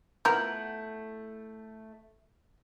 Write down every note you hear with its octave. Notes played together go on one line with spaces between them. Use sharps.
A3 B3 E4 F4 A#4 F#5 G6